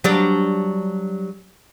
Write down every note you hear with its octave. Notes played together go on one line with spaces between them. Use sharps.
F#3 G3 D4